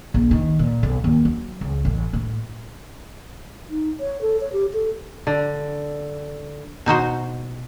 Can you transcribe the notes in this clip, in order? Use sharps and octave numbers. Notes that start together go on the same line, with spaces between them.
A#1
D#3
A#2
B1
D#2
F#3
C#2
A1
A2
D#4
C#5
A4
C#5
G4
A4
D3
B2 D#4 F#4 C5